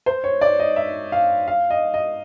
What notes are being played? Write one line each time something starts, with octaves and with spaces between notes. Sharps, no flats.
C5
C#5
D5
D#5
E5
F5
F5
D#5
D#5